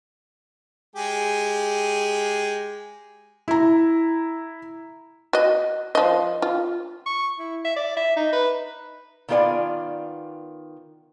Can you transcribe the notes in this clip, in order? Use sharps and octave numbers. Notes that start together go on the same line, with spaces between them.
G#3 G4 G#4
E4 A#5
F#4 D#5
F3 D#5
F4
C#6
E4
E5
D5
E5
D#4
B4
D#3 B3 F4 A#4 D5 G#5